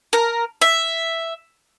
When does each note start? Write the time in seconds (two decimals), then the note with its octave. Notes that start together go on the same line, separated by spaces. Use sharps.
0.13 A#4
0.61 E5